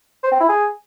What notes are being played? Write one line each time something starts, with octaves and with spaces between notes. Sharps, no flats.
C5
C4
E4
G#4